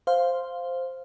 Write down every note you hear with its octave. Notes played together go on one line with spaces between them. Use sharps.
C5 F5